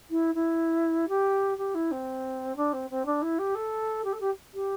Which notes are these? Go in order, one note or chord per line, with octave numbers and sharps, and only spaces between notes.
E4
E4
G4
G4
E4
C4
D4
C4
C4
D4
E4
G4
A4
G4
A4
G4
G4